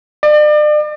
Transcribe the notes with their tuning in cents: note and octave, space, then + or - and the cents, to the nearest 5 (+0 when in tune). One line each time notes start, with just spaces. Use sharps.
D5 +40